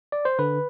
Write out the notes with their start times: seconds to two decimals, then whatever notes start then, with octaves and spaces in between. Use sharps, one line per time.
0.12 D5
0.25 C5
0.39 D3 B4